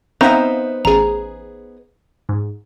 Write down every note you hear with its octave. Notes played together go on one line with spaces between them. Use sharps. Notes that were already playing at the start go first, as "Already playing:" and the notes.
B3 C4 D#4 C5 E5 F5 A#5
A1 G#4 A#5
G#2